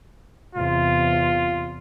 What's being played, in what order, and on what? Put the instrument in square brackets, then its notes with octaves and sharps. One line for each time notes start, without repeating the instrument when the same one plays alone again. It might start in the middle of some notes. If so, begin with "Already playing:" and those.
[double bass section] E2 C3 [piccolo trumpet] F4